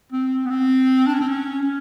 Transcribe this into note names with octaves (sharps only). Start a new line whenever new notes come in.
C4
B3
C4
D4
C#4
C4
C#4
C#4